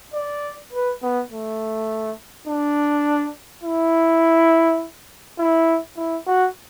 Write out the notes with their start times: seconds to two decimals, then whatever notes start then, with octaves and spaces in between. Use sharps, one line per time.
0.14 D5
0.73 B4
1.03 B3
1.31 A3
2.48 D4
3.64 E4
5.39 E4
5.97 E4
6.27 F#4